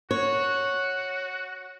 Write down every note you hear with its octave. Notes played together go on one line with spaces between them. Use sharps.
F#4 C#5